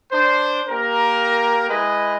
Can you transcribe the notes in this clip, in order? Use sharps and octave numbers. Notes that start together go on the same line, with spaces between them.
D4 C5
A#3 G4 A#4
G#3 E4 G#4 B4 D#5